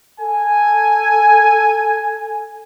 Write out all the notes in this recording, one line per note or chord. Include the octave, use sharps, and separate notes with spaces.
A4 G#5